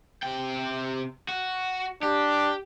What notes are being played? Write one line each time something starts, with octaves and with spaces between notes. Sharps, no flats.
C3 G5
F#4
D4 G4